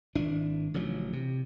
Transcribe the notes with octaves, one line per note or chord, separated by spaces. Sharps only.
G#1 E3 D4
A1 C#3 F3 F#3
C3